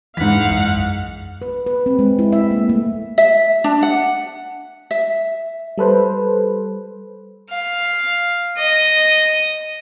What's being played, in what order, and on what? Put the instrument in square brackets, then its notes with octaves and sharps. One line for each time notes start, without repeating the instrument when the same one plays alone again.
[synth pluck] E2 E3 [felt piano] G#2 B6 [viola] F5 F#5
[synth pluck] B1 F#2
[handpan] B4
B4
C4
G#3
E4
E5
A#3
A3
[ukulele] E5
D4
F#5
E5
[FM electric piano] G3 A4 B4 C5
[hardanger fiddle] F5
D#5